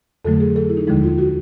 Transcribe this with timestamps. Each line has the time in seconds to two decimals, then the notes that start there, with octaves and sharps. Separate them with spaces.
0.25 F2 D3 F#3 A3 A4
0.40 G#4
0.56 A4
0.70 E4
0.77 D#4
0.87 D#2 D3 F3 G#3 E4
1.03 F4
1.18 F#4